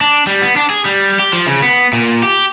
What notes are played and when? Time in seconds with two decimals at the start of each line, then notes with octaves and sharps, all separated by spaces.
0.01 D4
0.27 G3
0.41 B3
0.56 D4
0.70 G#4
0.85 G3
1.19 G4
1.33 F3
1.47 C#3
1.62 B3
1.93 A#2
2.23 G4